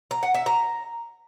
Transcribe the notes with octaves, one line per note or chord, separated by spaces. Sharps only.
A#5
F#5
E5
A#5